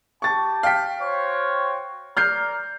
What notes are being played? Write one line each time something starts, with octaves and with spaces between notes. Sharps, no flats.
G4 A5 C#6 A6
F5 G5 B6
F#4 C5 C#5
A#4 D5 A#5 F6 G6 C7